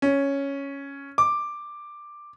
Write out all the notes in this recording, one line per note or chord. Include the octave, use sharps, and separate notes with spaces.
C#4
D6